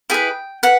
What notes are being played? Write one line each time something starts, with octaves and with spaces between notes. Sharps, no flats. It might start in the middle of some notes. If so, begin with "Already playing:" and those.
E4 G#4 B4 G5
B4 F#5